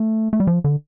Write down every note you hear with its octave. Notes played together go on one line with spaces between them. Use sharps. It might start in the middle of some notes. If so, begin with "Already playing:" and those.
Already playing: A3
A3
G3
F3
D3